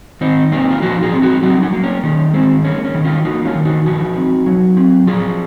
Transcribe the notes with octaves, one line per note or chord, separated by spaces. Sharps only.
D#3 C4 D#4
A#3 C4 D#4
F4
F3 D#4 F#4
F4 G#4
C4
D#4 F#4
F#3 C4 D#4
C#4
A#3
C#4
D#3 C#4
G#3 C4
A#3 C#4
C#4
D#3
C#4 F4
A#3 D#4 F#4
C#4 F4
D#3
D#4 F#4
F3 D#4 F#4
C4
F#3
C4
F3 F4 G#4